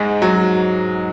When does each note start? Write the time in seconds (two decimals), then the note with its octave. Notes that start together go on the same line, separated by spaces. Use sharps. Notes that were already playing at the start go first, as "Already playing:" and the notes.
Already playing: G#2 G#3
0.22 F#3